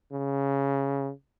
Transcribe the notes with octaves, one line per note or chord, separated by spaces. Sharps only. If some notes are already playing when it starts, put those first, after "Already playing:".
C#3